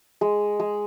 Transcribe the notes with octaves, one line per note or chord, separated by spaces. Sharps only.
G#3
G#3